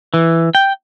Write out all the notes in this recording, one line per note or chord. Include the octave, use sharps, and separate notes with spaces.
E3
G5